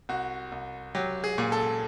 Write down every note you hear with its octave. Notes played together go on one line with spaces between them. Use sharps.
C2 F#4
C2
F#3 G4
G#4
A#2
A4